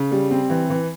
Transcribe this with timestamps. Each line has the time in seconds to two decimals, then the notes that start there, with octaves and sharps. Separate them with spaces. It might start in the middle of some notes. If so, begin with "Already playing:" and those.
Already playing: C#3
0.11 G3
0.31 C4
0.50 E3
0.70 E3